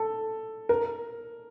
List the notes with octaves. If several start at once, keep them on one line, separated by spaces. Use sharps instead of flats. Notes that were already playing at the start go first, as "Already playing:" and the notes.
Already playing: A4
A#4